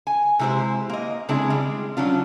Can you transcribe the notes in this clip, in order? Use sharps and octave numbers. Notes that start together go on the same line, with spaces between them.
G#5
C3 G#3 E4 F#4 G4 C5
A#3 D#5
C#3 G#3 C4 D4 E4 G#4
G3 G#3
F#3 C#4 D4 F4